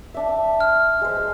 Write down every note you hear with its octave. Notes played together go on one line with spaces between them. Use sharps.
D4 E5
F6
G#3 C5